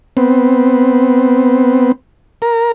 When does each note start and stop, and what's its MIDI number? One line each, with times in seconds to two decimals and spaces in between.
0.17 1.92 59
0.17 1.92 60
2.42 2.72 70